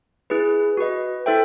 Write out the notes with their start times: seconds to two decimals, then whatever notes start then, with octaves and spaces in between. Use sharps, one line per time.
0.30 E4 G#4 B4
0.77 F#4 B4 D#5
1.26 E4 A4 C5 E5 G5